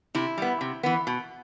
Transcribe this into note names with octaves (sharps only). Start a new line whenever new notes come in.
C3 E4
G3 B3
C3
E3 B3
B2